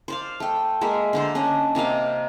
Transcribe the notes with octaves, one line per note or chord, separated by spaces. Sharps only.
C5 D5 F5
A3 G5
G#3 A#3 E5
D3 D4 C5
C#4 D4 D#5
C3 A#3 D#5 F5